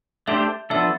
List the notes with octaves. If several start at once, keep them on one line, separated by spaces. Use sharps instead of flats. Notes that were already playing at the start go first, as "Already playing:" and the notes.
A3 D4 G4 C5 E5
F3 B3 D4 A4 E5